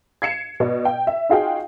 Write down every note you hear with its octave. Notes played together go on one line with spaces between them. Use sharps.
G#6 C7 C#7 E7
B2 D5
G5
E5
D#4 F4 F#4 G#4 F5 G5